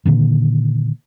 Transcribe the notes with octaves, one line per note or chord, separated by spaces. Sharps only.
A#2 D3 D#3